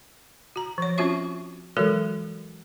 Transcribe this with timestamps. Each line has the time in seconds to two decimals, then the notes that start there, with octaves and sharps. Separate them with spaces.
0.56 F#4 A#5
0.78 F3 C#5
0.98 C4 C#4 F4 F#4 E5 C#6
1.77 E3 F#3 G#3 F#4 A4 A#4